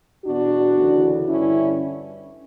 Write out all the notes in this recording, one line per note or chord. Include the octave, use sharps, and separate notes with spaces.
E2 B2 D4 F#4
D2 C#3 E3
G2 D3 C#4 E4